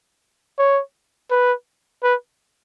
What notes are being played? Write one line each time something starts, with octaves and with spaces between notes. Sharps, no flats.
C#5
B4
B4